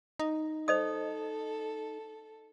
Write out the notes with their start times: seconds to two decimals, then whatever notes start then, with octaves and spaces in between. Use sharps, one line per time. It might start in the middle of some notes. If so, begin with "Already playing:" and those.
0.20 D#4
0.68 A4 C5 D#5 D#6